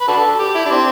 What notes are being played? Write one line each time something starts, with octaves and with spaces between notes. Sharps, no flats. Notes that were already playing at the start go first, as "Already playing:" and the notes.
B4
D4 F#4 A4
G4
E4
D4
C4